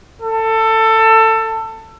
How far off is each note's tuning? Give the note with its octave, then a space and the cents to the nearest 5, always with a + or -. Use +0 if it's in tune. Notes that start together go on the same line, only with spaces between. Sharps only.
A4 +20